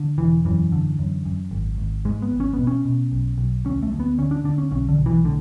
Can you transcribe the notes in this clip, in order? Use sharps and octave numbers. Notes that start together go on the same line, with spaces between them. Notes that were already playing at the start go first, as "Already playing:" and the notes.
Already playing: D3
E1 E3
F#2 E3
D3
F#2
F#2
G#1
G#1
G#2 G#3
B3
G#1
C#4
B3
B2
C#4
B2
B1
B1
D2 C#4
A3
D2
B3
D3 C#4
D4
D3 D4
C#4
B1 C#4
D3
B1
E3
A2 D3